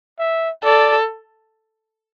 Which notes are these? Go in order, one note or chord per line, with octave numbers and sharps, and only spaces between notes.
E5
A4 D5